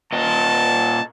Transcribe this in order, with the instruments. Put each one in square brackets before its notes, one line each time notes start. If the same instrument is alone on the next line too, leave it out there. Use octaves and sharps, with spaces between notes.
[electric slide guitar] A#2 D#5 [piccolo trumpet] A5